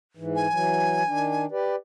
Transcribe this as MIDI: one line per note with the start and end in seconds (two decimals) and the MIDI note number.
0.17 0.47 44
0.17 0.47 52
0.36 1.45 80
0.50 1.03 52
0.50 1.03 54
1.07 1.46 51
1.07 1.46 62
1.51 1.76 67
1.51 1.76 71
1.51 1.76 74